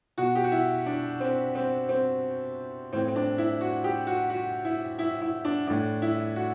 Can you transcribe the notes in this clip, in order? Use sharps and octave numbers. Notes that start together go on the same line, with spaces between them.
B2 F#4
G4
F#4
E4
D4
C4
C4
C4
A2 E3 C4
C4
D4
E4
F#4
G4
F#4
F#4
E4
E4
E4
D4
A2 E3 D4
E4
F#4